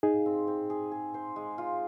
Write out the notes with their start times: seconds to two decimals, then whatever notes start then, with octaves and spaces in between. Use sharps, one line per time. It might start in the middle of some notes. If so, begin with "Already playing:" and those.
0.03 D#4 G#4 F5
0.26 C4
0.47 C4
0.70 G#4
0.92 G#4
1.14 C5
1.36 G#3
1.58 F4